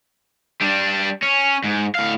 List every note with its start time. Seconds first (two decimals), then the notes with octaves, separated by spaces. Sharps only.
0.61 G3 D4
1.23 C#4
1.64 G#2
1.95 A2 F5